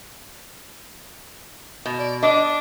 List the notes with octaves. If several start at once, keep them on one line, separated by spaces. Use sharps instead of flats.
B2
D5
D4 D#5